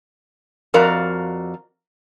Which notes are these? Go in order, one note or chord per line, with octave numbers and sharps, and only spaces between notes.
F2 F#4 A#4 D5 F5 A#5